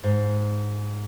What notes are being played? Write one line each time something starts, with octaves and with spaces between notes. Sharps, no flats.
G#2